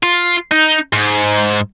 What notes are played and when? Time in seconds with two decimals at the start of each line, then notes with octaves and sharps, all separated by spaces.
0.03 F4
0.52 D#4
0.93 G#2